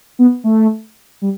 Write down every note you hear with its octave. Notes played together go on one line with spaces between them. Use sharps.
B3
A3
G3